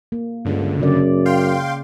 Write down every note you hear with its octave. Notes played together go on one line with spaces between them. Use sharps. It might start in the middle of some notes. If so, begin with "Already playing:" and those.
A#3
C#2 G2 D3
F#2 C#3 D5
F5 G5 C6